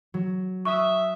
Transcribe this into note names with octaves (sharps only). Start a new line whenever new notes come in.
F#3
E5 C#6 D#6 E6 F#6